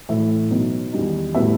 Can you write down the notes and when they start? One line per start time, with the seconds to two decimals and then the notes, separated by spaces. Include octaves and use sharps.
0.09 A2 E3 A3 E5
0.50 B2 F#3 B3 D#4
0.92 E2 D#3 G3 D#4
1.35 A2 G3 B3 E5